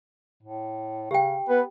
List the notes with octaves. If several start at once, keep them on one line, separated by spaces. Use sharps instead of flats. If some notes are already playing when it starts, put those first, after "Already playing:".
A2
C#3 G4 G5
B3 B4